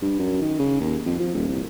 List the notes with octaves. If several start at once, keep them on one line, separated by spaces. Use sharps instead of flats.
G2
F#2
D#3
C#3
D#2
F2
F3
D#1
C2